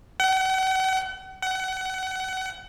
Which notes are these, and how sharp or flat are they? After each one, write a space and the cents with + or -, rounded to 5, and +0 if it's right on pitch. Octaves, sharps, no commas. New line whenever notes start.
F#5 +40
F#5 +30